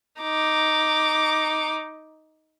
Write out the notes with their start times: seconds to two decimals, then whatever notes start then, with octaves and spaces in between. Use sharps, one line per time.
0.21 D#4 D6